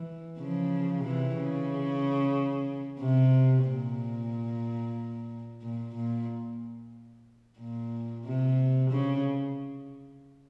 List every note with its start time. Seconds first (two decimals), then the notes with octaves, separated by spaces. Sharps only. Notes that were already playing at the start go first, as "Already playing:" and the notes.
Already playing: E3
0.39 C#3 F3
1.03 C3 E3
1.36 C#3
3.00 C3
3.65 A#2
5.62 A#2
5.95 A#2
7.58 A#2
8.24 C3
8.90 C#3